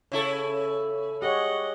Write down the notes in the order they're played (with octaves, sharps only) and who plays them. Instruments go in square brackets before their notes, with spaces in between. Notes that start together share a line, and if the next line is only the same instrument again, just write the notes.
[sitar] C#3 E4 A4 [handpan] C#5
[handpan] G4 G#4 C#5 [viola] D#5 F#5